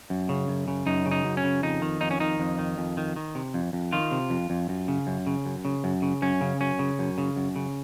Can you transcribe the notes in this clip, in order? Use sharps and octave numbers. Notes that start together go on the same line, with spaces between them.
F#2
C#3
F#2
C#3
F#2 D#4
C#3
D#4
F#2
C#4
C#3
F2 D#4
D#3
F2 D#4
C#4
D#3 D#4
F2
D#3
F2
D#3
D#3
C3
F2
F2
D#3 F4
C3
F2
F2
F#2
C#3
F#2
C#3
F#2
C#3
F#2
C#3
F#2 C#4
C#3
F#2 C#4
C#3
F#2
C#3
F#2
C#3